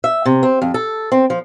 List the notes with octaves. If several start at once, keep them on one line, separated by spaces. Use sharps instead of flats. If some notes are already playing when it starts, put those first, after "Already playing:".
E5
C3
C4
F2
A4
C4
F3